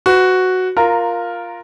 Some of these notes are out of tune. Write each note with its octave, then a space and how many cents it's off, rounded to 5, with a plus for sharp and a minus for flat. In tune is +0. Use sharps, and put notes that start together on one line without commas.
F#4 +0 B4 +30
F4 +0 A#4 +0 A#5 -15